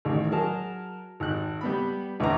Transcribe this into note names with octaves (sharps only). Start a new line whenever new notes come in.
A1 D#3
F#3 G#4 A#4 A5
G#1 F#6
G3 B3 B5
A#1 E2 B4 A#5